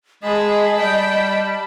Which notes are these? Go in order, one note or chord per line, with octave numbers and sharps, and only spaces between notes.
G#3 G#4 D#5 A5 B5
G3 G5